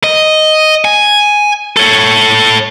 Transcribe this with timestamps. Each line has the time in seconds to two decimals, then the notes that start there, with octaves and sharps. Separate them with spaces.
0.04 D#5
0.85 G#5
1.77 A4 C#5